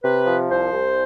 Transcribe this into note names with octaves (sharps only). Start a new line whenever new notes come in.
C3 B4
F3
C2 C5
C2